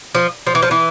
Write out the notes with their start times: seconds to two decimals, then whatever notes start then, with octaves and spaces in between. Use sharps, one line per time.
0.15 F3
0.47 F3
0.55 E3
0.62 F3
0.71 E3